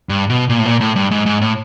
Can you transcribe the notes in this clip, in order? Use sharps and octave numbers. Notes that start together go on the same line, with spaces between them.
G2
B2
A#2
A2
A#2
A2
G2
G#2
G#2
A2